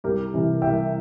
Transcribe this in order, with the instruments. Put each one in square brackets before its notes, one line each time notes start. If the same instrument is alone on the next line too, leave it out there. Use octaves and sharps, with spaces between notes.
[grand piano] C2 G4 A#4
C3 E3
C2 E5 G5